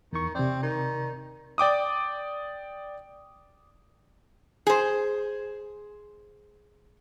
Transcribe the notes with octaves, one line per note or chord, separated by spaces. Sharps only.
E2 D#3 C#6
C3 C4 D5
D#3
D5 G5 D6 D#6
G#4 C5